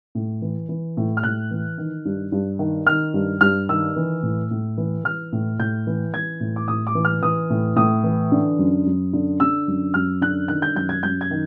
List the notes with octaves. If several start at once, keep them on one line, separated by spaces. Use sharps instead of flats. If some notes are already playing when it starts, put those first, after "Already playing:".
A2
E3
E3
A2
F6
A2 F#6
E3
D#3
G2
G2
D#3
D#3 F6
G2
G2 F6
D#3 E6
E3
A2
A2
E3
E3 F6
A2
A2 G6
E3
E3 G#6
A2
D6
A2 D#6
D6
E3
F6
E3 D#6
A2
A2 D#6
E3
D3
F#2
F#2
D3
D3 E6
F#2
F#2 F6
D3 F#6
D#3 F#6
G6
F#2 G6
G#6
F#2 G6
G#6
D#3